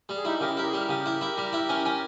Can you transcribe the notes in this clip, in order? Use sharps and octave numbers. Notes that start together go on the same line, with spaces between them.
G3
G#4
D#4 E4 G4
C#3 G4 A#4
E4 G4 A#4
G#4
G3 G4 A#4
C#3
E4
E4
G3
E4
C#4
C#4